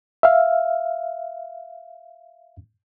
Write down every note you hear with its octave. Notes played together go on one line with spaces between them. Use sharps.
E5 F5